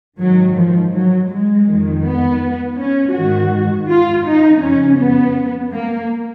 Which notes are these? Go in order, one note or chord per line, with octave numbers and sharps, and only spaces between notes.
G#2 D#3 F#3
F3
F#3
G#3
F2 D#3
B3
C#4
G#2 D#3 F#4
F4
D#4
F2 C#3 C#4
B3
A#3